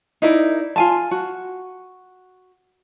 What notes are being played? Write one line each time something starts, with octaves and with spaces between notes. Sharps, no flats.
D#4 E4 A#4 D5
F4 G#5 A5
F#4